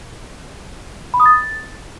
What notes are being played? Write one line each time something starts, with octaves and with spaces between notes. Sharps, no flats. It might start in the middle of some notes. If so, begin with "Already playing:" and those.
B5
D#6
A6